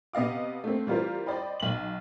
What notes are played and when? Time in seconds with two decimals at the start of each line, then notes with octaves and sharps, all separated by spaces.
0.13 C3 B3 D#5 F5 D6
0.64 A3 A#3 C4
0.87 E3 G3 F4 A#4 C5
1.26 C5 D5 D#5 G5 B5
1.60 B1 F#7